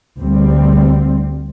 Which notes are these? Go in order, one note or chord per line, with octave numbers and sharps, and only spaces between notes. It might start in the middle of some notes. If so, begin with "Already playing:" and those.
D2 G3 C4